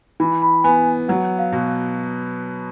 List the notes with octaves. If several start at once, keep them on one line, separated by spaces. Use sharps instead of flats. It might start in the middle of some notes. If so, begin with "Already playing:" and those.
E3 B5
B5
B3 G#5
F#3 F#5
F5
B2
F5